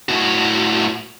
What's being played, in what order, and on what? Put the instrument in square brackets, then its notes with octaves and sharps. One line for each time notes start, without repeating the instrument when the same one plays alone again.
[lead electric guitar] A2 F#4